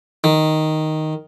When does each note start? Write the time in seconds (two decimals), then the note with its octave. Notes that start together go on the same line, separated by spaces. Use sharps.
0.24 D#3